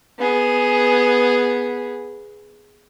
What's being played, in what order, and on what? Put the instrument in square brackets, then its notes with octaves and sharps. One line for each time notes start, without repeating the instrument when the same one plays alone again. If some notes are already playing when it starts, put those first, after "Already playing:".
[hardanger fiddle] B3 G#4